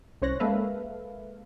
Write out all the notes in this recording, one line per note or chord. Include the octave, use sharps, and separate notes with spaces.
C2 C#4 C5 C#5 F#6 A#6
G#3 A#3 A4 B4 E5 F5